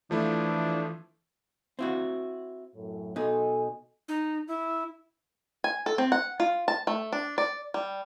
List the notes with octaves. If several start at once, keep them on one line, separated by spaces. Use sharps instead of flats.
E3 F3 A3 D4 E4
C4 E4 F#4
F#2 A2
B2 D#4 A4 G#5
D#4
E4
G#5
A4
C4
F#5
F4
A5
A3
D4
D5
G3